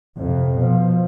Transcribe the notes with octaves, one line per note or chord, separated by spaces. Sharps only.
F2 C3
B2 F3